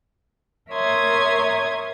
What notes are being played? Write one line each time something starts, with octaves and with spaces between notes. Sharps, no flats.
A#4 C#5 E5 C6 D#6 G#6